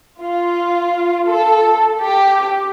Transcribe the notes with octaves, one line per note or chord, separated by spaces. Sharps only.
F4
A4
G4